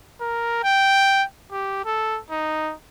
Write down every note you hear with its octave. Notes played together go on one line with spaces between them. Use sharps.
A#4
G5
G4
A4
D#4